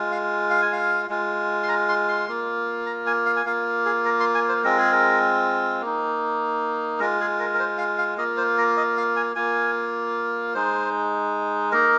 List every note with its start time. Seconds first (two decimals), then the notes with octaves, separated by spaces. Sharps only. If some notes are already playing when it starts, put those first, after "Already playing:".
Already playing: G#3 F4
0.12 F5
0.51 F5
0.62 G#5
0.73 F5
1.09 G#3 F4
1.63 C6
1.69 A#5
1.89 C6
2.08 C6
2.28 A#3 F4
2.86 A#5
3.06 G#5
3.26 F5
3.36 G#5
3.45 A#3 F4 F5
3.85 G#4
4.05 A#4
4.20 C6
4.35 G#5
4.49 C5
4.64 G#3 C4 F4 A#4
4.78 G#4
4.92 A#4
5.81 A#3 D#4
6.99 G#3 F4 A#4
7.20 G#4
7.40 A#4
7.54 A#4
7.59 C5
7.78 F5
7.98 F5
8.18 A#3 F4 D#5
8.37 C5
8.58 A#4
8.77 D#5
8.97 F5
9.16 G#5
9.36 A#3 F4 G#5
10.54 G#3 D#4 C5
11.72 A#3 D#4 A#4